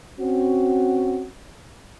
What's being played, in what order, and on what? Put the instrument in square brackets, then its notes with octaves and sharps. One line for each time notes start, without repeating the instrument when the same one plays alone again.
[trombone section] C4 C#4 F#4